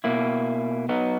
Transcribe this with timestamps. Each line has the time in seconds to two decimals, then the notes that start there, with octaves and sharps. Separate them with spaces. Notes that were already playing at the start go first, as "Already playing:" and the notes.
0.04 B2 A#3 E4
0.89 F#3 B3 D#4